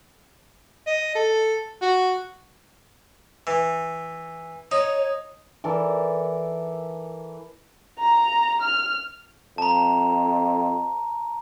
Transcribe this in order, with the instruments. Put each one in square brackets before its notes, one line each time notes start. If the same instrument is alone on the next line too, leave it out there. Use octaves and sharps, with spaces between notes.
[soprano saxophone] D#5
A4
F#4
[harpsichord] E3
[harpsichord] D#4 [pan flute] C#5
[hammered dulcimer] E3 A4 A#4 D5
[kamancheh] A#5
F6
[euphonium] F2 [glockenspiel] A5 A#5